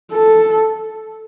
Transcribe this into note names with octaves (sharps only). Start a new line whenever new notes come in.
A4